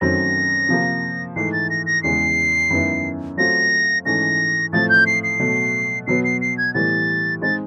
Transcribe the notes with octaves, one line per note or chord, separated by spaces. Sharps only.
F#2 D#3 F#3 A3 C4 A#6
C3 F3 A#3
G#2 E3 A3 C7
A6
A#6
A#6
E2 C#3 E3 G#3 C7
F#2 D#3 G#3 B3 E4
F#3 A3 C4 F4 A#6
G#2 E3 A3 C#4 A#6
A2 F3 A3 C4 A6
G6
C7
C7
B2 F#3 A3
B2 F#3 B3 C7
C7
C7
G#6
A2 E3 G3 B3 A6
G#3 C4 D#4 A6